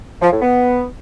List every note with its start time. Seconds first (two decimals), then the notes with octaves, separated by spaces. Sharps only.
0.22 F3
0.32 A2
0.42 B3